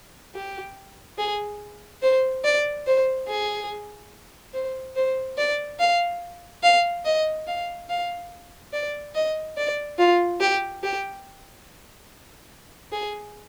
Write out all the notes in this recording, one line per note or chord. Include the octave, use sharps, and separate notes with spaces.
G4
G#4
C5
D5
C5
G#4
C5
C5
D5
F5
F5
D#5
F5
F5
D5
D#5
D5
F4
G4
G4
G#4